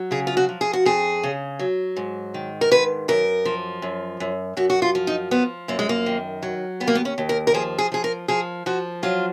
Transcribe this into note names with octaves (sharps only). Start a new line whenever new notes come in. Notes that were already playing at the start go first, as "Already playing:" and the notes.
Already playing: F#3
C#3 G#4
F4
F#4
F3
G#4
F#4
F2 G#4
C#3
F#3
G#2
D#3
A#4
G#2 B4
F#2 A#4
F3
F#2
F#2
F#2 F#4
F#4
F4
F3
D#4
F3 B3
F#2 A#3
G#3
A#3
D#3
F#3
D#2 B3
A#3
B3
C#4
D#2
A#4
A#4
F3 G#4
G#4
F3 G#4
A#4
F3 G#4
F3 F#4
F#3 F4